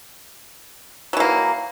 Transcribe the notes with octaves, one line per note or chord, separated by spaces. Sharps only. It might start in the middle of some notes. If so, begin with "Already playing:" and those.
E3 F#3 A#3